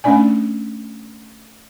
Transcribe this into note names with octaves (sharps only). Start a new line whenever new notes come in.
A3 C#4 D4 D5 G#5